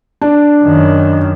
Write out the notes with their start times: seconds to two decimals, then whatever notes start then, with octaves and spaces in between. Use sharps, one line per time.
0.21 D4
0.63 F#2 D#3